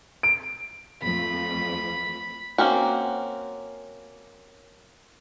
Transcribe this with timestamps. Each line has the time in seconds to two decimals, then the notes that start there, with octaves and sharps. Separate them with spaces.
0.23 D7
1.02 F2 F3 A3 B5
2.58 A#3 C4 C#4 F#4